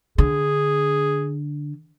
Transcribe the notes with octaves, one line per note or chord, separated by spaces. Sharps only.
D3 G#4